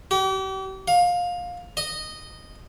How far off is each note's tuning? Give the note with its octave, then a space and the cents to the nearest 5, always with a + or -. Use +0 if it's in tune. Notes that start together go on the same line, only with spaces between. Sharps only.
G4 -40
F5 +20
D#5 -10